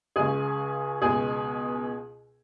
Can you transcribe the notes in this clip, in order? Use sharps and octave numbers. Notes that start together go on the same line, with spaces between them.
C#2 C#3 G#4 G#5
C#2 B2 G#4 G#5